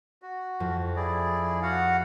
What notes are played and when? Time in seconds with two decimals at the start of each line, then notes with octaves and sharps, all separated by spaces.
0.22 F#4
0.60 F2
0.96 E4 G#4 D5
1.62 F#4 F5 F#5